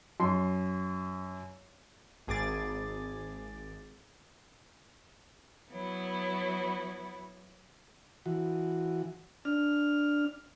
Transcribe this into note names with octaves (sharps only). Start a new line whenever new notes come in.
F#2 C6
G#1 G#4 D6 A6
F#3 B3 E4
E3 F#4
D4 F6